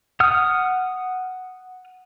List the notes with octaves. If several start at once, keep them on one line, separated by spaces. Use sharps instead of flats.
F#5 D#6 F6